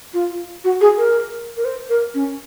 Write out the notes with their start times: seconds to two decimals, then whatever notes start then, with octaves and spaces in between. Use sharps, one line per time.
0.14 F4
0.64 F#4
0.81 G#4
0.98 A#4
1.57 A#4
1.65 C5
1.90 A#4
2.14 C#4